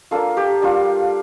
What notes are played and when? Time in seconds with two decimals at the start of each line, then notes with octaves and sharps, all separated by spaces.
0.11 A#3 D4 F4 A4
0.37 G4
0.62 G3 D4 F4